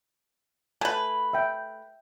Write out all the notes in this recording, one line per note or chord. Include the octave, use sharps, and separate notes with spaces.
A3 B4 G#5
E5 G5